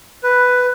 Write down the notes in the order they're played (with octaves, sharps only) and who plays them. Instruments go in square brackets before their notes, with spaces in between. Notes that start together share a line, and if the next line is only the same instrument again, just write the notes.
[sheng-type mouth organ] B4